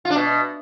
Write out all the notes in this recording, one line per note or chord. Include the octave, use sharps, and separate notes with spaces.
F4
D4
B2